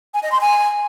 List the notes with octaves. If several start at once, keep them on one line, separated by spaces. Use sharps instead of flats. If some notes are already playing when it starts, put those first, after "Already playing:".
G#5
D#5
C6
G#5